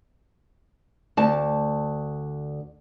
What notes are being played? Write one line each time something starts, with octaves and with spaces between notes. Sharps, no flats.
D2 A5